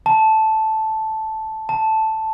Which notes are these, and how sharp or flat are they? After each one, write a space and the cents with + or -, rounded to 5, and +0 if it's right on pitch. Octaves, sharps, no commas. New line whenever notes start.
A5 -5
A5 +0